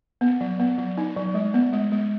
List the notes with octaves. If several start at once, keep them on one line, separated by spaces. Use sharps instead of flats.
B3
F#3
B3
F#3
D#4
F#3
G#3
B3
G#3
G#3